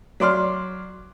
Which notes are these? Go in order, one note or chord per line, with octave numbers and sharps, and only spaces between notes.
F#3 D5 C6 F6